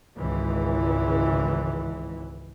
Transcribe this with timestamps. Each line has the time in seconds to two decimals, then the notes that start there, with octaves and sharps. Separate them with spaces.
0.18 G#1 C#2 E3